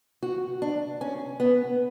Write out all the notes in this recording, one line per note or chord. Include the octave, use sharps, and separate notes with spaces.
F#4
D4
C#4
B3